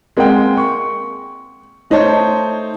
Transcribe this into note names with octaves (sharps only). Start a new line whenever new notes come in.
G#3 A#3 C4 F#5 G5
C#6
A3 D#4 C5 C#5 A5